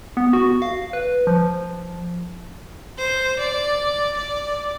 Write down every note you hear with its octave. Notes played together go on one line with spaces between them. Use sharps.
B3
F#4
F5
B4
F3
C5
D5
D5